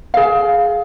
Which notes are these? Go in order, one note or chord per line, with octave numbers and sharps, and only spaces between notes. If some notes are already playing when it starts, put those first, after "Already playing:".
G#4 F5